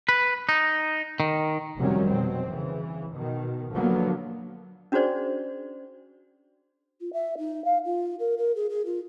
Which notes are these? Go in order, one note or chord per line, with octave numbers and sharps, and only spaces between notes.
B4
D#4
D#3
F1 C3 D#3 F#3 G3 C#4
B2 F#3 C4
C#3 E3
B2 D#3
D3 F3 F#3 A#3 B3
C#4 D4 F#4 G#4 C5 D5
F4
E5
D#4
F5
F4
A#4
A#4
G#4
G#4
F4